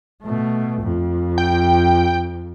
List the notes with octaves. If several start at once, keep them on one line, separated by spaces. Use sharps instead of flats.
B2 A3
F2
G5